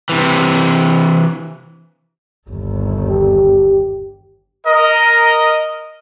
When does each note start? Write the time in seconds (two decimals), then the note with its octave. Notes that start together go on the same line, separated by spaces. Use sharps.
0.09 C3 E3
2.50 G1 D#2
3.09 G4
4.65 A#4 D#5